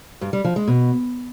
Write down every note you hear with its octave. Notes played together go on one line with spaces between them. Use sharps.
G2
G3
F3
G#3
B2